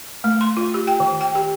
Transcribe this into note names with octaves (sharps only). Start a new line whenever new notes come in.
A3
C6
F4
G4
G5
D#3
G5
G4